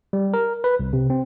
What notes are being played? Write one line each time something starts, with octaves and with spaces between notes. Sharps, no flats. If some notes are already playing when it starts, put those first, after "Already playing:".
G3
A#4
B4
C2
C3
C4